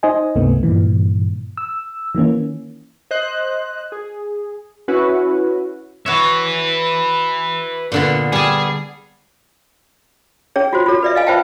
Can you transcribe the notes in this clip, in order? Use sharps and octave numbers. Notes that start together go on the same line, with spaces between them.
D#4 C5 D#5 G#5
C#2 G2 C3 A3 B3
G2 A#2 D#3 E3
E6
D#3 E3 A#3 C#4
C5 D#5 F#6
G#4
C#4 E4 F#4 B4
F#4 B4 C#5 E5
A#2 D3 B3
G3 G#4 A5
C#4 G#4 C#5
F4 F#4 C5
F4 F#4 A4 C#5
B4 D5 E5
D#5 F5 G#5
F4 B4 C5 E5 G5 A5